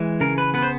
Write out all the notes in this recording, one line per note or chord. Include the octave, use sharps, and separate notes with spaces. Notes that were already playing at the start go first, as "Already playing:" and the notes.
Already playing: E3 G#3
C#3 A#4
B4
B3 B4
C5